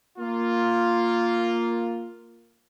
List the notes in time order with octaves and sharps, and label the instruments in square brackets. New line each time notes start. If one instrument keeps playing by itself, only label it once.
[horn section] A#3 F4